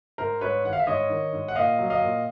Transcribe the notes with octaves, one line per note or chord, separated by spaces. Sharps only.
G#2 A#4 C5
G#2 B4 C#5
D#3 F#5
F5
E5
G#2 C#5 D#5
D#3
G#2
F#5
A#2 D#5 F5
F#3
D#5 F5
A#2